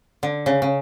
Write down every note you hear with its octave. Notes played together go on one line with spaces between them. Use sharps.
D3
C#3
C#3